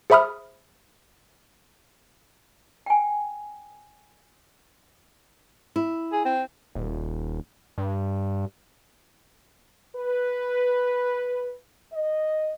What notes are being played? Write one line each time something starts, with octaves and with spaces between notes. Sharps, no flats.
G#4 C5 E5 B5 D#6 F6
G5 G#5
E4
G#4
C4
D#1
G2
B4
D#5